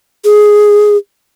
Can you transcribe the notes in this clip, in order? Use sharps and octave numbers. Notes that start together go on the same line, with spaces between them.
G#4